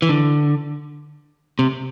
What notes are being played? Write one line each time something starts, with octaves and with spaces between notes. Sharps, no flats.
E3
D3
C3